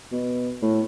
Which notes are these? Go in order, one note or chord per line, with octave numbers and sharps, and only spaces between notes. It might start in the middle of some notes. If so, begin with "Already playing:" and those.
B2
A2